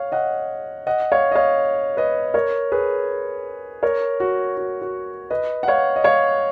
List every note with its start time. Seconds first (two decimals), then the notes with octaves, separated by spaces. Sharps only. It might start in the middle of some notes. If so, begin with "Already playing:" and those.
Already playing: C#5 F5
0.12 D#5 F#5
0.87 D#5 F#5
1.12 C#5 F5
1.31 D#5
1.35 C#5 F5
1.97 B4 D#5
2.34 A#4 C#5
2.72 G#4 B4
3.83 A#4 C#5
4.20 F#4
4.57 F#4
4.81 F#4
5.31 B4 D#5
5.63 F#5
5.68 C#5 F5
5.96 D#5
6.04 C#5 F5